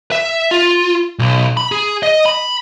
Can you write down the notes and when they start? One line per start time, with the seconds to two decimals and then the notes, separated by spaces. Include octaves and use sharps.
0.12 E5
0.51 F4
1.19 B1
1.57 B5
1.72 G#4
2.03 D#5
2.26 B5